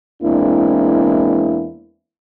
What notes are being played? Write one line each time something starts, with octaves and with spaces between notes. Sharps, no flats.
E2 G#3 A#3 C4 D4 E4